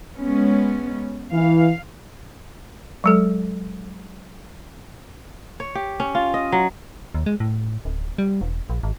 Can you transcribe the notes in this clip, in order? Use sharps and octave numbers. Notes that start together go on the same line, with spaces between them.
G#3 B3 C#4
E3 F5
F#3 G#3 A4
C#5
G4
C#4
F4
D#5
F#3
D#2
G#3
A2
D1
G3
E1
A#1
G#1